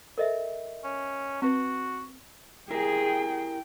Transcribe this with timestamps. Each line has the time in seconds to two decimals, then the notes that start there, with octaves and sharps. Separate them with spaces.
0.18 A4 A#4 C5 D#5 E5
0.84 C#4
1.42 C4 F#4 B4
2.70 E4 G4 G#4 A#4 G5